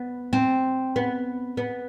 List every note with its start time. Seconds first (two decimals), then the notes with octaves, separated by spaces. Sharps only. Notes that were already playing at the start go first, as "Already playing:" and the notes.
Already playing: B3
0.33 C4
0.96 B3
1.57 B3